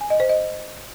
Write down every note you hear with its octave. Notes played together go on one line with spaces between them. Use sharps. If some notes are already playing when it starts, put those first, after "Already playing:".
G#5
D#5
C5
D#5